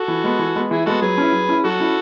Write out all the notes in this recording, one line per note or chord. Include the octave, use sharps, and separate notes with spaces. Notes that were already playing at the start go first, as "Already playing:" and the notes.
Already playing: F#4 A4
E3
G#3 B3
E3
G#3 B3
E3 E4 G#4
G#3 B3 F#4 A4
F#3 G#4 B4
C#4 E4
F#3
C#4 E4
F#3 F#4 A4
C#4 E4